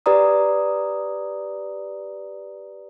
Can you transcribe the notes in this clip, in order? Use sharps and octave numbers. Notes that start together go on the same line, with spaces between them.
G4 B4 D5 A#5 D#6